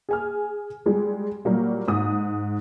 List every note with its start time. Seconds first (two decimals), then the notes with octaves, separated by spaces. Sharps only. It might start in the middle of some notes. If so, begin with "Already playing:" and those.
0.09 G#4 G#5 F6
0.86 G3 G#3
1.45 A#2 F#3 G3 A#3
1.88 G#2 D#6